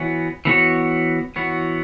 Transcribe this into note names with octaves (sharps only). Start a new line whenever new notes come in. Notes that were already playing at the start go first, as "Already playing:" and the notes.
Already playing: E3 B3 F#4 C#5
E3 B3 F#4 C#5
E3 B3 F#4 C#5